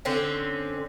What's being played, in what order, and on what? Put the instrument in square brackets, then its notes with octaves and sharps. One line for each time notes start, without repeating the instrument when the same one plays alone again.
[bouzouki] D3 C4 C#4